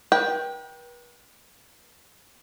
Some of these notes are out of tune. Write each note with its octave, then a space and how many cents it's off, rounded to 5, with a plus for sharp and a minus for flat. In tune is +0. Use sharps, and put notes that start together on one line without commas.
B4 -40 G5 +0